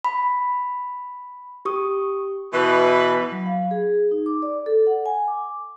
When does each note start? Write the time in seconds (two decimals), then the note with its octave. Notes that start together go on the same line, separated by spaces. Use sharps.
0.05 B5
1.65 G4 C#6 D#6
2.53 B2 E3 B4
3.32 F#3
3.46 F5
3.71 G#4
4.11 D#4
4.26 D6
4.42 D5
4.66 A4
4.87 F#5
5.06 G#5
5.28 D6